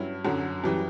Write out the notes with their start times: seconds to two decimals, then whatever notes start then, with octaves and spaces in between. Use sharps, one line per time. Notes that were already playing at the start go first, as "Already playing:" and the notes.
Already playing: G2 F#3 C#4 E4
0.25 F#2 D3 F#3
0.64 F#2 E3 G3